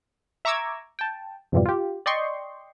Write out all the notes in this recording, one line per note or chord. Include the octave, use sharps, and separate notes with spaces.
E5 A#5 C#6 D6 E6 G#6
G5 A5
F2 G#2 B2 E3 F3 G3
F4 G4
D5 D#5 G5 C6 C#6